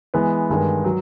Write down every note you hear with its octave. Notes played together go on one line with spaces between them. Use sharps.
E3 G#3 B3
G2 D#3 G#3
F#3